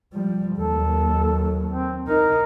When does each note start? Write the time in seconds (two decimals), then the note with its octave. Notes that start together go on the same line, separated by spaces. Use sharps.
0.13 F3 G3
0.56 D#2 F#3 A4
1.70 C4
2.08 D#4 A#4